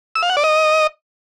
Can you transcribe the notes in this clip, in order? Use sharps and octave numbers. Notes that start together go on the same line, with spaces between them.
E6
F5
F#5
D5
D#5